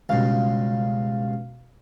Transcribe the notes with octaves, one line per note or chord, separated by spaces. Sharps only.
C#2 G2 B2 F5